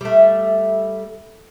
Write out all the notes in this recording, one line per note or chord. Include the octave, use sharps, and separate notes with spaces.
G3 A3